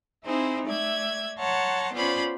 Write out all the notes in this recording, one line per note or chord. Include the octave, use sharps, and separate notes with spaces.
C4 D#4 E4 G#4 C5
A3 D5 E5 G#6
C#5 F#5 A5 A#5 C6
B3 C#4 F4 C5 D5 B5